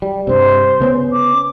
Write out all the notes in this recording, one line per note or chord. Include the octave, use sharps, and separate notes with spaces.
G3
G2 C3 C5
C#3 B3 C#4
D6